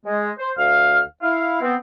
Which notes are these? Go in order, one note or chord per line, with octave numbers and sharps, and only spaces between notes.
G#3
C5
D2 F5 F6
E4 F5
B3 C4